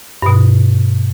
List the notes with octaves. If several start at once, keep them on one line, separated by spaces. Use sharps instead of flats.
G2 B2